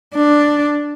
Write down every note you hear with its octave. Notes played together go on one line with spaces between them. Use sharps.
D4